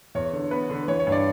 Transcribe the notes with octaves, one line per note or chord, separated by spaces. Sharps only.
E2 C#5
D3
B3 B4
D3
E3 C#5
C#5
G2
D5